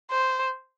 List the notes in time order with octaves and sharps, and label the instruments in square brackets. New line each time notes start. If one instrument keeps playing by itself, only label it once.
[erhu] C5